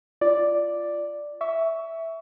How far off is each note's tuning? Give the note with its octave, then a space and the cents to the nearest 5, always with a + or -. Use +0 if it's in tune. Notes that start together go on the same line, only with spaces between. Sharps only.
F4 -20 D5 +0
E5 -5 C#6 +25